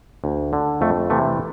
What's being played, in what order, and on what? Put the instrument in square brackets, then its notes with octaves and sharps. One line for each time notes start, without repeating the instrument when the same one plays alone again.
[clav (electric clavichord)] D2
D3
F2 A3
C3 E3 A3